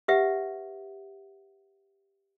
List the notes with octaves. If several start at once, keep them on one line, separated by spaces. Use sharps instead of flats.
G4 B4 E5 F#5